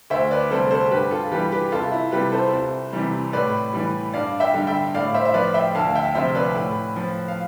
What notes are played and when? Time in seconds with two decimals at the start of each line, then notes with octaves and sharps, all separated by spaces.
0.10 D2 C5 E5
0.31 B4 D5
0.51 C3 G3 A4 C5
0.71 A4 C5
0.91 G2 G4 B4
1.11 F4 A4
1.31 E3 G3 G4 B4
1.51 G4 B4
1.72 C2 F4 A4
1.92 E4
2.12 C3 G3 G4 B4
2.32 A4 C5
2.53 C2
2.93 C3 E3 G3
3.33 A2 B4 D5
3.73 E3 G3
4.14 G2 D5 F5
4.40 E5 G5
4.54 D3 G3
4.67 E5 G5
4.94 A2 D5 F5
5.14 C5 E5
5.25 E5
5.34 F3 B4 D5
5.54 E5 G5
5.75 D2 F5 A5
5.95 E5 G5
6.15 C3 F3 C5 E5
6.35 B4 D5
6.55 A2
6.96 F3
7.28 F5